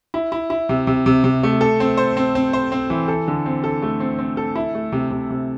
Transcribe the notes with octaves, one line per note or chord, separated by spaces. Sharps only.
E4
E4
E4
C3
C3
C3
C3
A3
A4
C4
C5
C4
C4
C5
C4
E3
A4
D3
C4
A4
A3
C4
C4
A4
E4
A3
C3
C3
C3